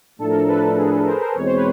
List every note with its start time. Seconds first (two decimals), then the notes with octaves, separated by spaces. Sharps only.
0.19 A2 F3 A3 D4 A4
0.29 A#4
0.33 A4
0.48 A4 B4
0.63 A4
0.77 G#4
0.92 A4
1.06 A#4 C5
1.21 A#4 C5
1.35 E2 B2 G#3 C4 C#5
1.45 C5
1.56 B4 C#5